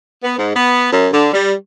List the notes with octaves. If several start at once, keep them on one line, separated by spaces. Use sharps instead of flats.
B3
G#2
B3
F#2
D3
G3